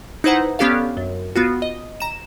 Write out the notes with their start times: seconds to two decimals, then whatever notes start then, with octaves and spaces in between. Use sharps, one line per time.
0.24 D#4 E4 B4 C5 F#5 A#5
0.59 B3 C#4 D4 G4 A4 F5
0.97 F#2
1.36 B3 F4 F#4
1.62 D#5
2.00 A#5 E7